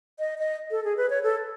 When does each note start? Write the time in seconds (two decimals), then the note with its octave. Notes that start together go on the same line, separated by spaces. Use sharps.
0.19 D#5
0.38 D#5
0.71 A4
0.84 G#4
0.97 B4
1.10 C#5
1.23 A4